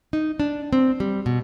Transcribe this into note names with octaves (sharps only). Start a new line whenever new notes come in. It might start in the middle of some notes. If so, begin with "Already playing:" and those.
D#4
D4
C4
G3
B2